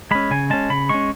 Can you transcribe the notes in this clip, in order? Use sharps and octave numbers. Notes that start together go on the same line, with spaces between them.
G#3 C#4 B5
C#3 G#5
G#3 C#4 A5
C#3 B5
G#3 C#4 C#6